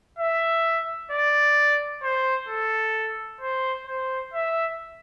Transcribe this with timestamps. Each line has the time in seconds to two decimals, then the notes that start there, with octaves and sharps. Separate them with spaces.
0.19 E5
1.11 D5
2.03 C5
2.49 A4
3.41 C5
3.87 C5
4.34 E5